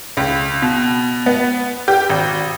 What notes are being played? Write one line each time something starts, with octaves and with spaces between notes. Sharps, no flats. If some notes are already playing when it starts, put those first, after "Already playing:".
C#2
B2
B3
G4
G#1